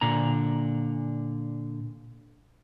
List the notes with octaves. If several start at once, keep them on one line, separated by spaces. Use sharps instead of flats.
A#2 D3 A#5